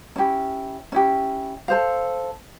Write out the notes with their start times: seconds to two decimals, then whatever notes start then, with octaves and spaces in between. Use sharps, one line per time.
0.16 C#4 E4 G4
0.92 C#4 E4 G4
1.68 A4 C5 F5